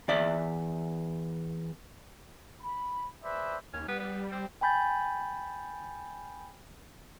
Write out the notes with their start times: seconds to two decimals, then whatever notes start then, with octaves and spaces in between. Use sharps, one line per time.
0.08 E2 D5 E5
2.61 B5
3.23 G#4 B4 C5 D5 E5
3.74 D#2 C#4
3.88 G3 B3
4.00 B3
4.32 C4
4.61 G5 G#5 B5 G6 A6